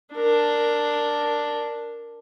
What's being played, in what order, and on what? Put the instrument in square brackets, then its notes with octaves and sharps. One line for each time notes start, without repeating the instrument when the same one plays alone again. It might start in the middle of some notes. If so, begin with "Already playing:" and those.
[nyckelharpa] D4 A#4